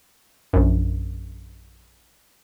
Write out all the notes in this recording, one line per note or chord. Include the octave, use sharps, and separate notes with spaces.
A#1 F#2